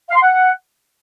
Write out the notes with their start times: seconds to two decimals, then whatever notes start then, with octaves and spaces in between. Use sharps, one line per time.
0.10 F5
0.16 C6
0.22 F#5